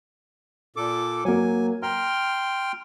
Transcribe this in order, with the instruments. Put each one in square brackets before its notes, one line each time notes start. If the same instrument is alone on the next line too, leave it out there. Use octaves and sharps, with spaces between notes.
[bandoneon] A#2 A4 D6
[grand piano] F#3 A#3 [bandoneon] G#5
[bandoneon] G5 C6 F6 [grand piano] A#5